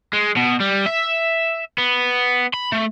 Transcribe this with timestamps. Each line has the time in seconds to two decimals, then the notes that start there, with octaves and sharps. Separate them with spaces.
0.13 G#3
0.36 B2
0.60 G3
0.86 E5
1.78 B3
2.54 B5
2.72 A3